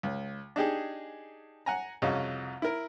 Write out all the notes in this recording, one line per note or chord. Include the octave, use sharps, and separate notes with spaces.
C#2
D4 D#4 G4 G#4
F#5 G#5 A#5
C2 F2 C#3 C#4 F#4 D#5
E4 A#4